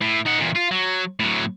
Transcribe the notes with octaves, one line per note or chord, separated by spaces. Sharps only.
A2
D#4 F#5
E2 A#2
F4
F#3
A2 F#3